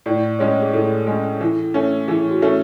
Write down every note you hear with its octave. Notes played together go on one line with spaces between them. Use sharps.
A2 D5
G#3 C#4 C#5
G#4
A2 A4
G#3 C#4
E3
A3 C#4
E3 G#4
F#4
A3 C#4